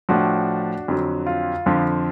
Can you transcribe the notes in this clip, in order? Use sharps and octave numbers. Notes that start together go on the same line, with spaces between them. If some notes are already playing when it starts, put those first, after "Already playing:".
A2 F3 D4 F#4
F2 D3 F#3
F4
F2 D3 F3